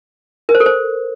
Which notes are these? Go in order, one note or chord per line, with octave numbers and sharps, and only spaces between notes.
A#4
C5
A4
C5